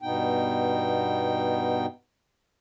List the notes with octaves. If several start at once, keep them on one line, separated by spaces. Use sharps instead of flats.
G2 B2 B3 D#4 G5